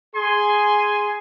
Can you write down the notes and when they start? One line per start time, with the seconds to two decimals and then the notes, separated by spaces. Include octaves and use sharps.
0.15 G#4 G#5 C6